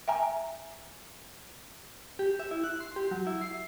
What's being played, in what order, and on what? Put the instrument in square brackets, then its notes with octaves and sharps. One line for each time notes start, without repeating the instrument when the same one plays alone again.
[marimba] E5 G5 G#5 A#5
[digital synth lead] G4
E5
E4
F#6
C6
G4
F#3
E4
C7